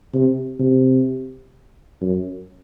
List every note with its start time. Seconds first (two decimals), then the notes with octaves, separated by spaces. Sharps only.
0.13 C3
0.59 C3
2.01 F#2